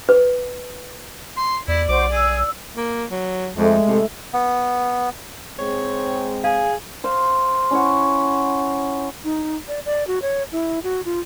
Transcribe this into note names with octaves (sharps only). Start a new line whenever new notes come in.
B4
C6
E2 E4 D5
B1 F#4 C5 D6
G#4 E6
A#3
F#3
F2 G#3 A3
A2 C3 A4
B3
G#2 G#3 C4 C#5
G#4 F5 G#5
C5 F5
C#4 E4 F#5
D#4
D5
D5
F#4
C#5
E4
F#4
F4